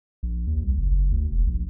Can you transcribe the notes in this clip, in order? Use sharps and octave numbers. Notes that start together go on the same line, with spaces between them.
A#1
D#2
C2
F#1
D2
E1
A#1